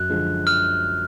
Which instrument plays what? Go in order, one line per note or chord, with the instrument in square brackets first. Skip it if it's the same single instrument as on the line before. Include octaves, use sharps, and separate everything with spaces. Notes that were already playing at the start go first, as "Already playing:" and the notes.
Already playing: [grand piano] F#2 [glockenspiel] F#6
[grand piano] D3 F3 G#3
[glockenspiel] F6